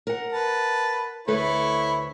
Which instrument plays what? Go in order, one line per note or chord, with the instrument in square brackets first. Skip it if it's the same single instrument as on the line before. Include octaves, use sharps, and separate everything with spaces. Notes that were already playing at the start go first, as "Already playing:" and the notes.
[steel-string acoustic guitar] A#4 F#5
[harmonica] B4 A5
[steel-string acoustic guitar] D2 A4 B4 [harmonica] E4 C#5 B5